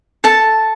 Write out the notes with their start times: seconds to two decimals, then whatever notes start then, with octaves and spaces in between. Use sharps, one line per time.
0.24 A4 A5